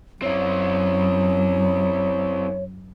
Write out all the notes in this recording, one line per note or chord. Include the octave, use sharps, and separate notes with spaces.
F#2 C4 E4 C#5